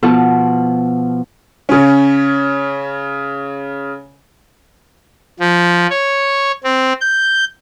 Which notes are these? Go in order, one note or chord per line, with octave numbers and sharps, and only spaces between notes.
B2 F3 F4 A4
C#3 C#4
F3
C#5
C4
G6